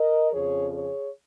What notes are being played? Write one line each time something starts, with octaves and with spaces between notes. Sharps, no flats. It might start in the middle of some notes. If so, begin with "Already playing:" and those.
Already playing: A#4 D#5
F2 C#3 F3 G#4 C#5
G#4 C#5